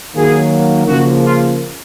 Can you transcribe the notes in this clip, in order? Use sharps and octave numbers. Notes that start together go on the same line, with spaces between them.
D#3 F#3 A#3 G#4
C#3 F3 A#3 F#4
F4